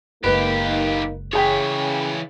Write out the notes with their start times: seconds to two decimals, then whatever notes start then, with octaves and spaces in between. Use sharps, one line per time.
0.24 F#1 B1 G#3 A#3 D#4 G4 B4
1.33 C#3 E3 G#4 C#5 G5 B6